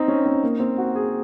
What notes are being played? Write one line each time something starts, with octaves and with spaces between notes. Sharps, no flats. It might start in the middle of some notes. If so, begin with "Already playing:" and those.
Already playing: C4 D#4
C#4
C4
A#3
C4
F#4
G#4